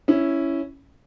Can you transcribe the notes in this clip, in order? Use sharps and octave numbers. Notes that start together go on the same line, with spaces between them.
C#4 E4